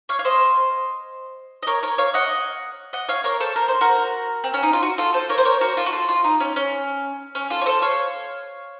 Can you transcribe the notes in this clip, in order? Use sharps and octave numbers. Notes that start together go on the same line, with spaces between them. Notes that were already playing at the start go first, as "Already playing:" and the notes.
C#5 F5
F5
C5 D#5
D#5
A#4 C#5
A#4 C#5
C#5 F5
D#5 F#5
D#5 F#5
C#5 F5
A#4 C#5
A4 C5
A#4
C5
F#4 A#4
C4
C#4
D#4
F4
F#4
F4 A4
A4 C5
A#4 C#5
C5
A#4 C#5
F#4 A#4
F4 A4
F#4
F4 A4
F4
D#4
C#4
C#4
C#4
F4 A4
C#5
A4 C5
C#5 F5